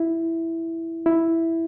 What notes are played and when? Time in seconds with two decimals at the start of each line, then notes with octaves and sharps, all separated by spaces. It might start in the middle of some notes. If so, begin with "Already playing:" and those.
Already playing: E4
1.06 E4